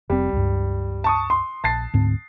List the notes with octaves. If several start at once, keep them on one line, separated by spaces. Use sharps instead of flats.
F1 G3 C4
C#2 G2
A5 C#6 D#6
C6
A#1 A5 A6 C7
D2 G#2 C4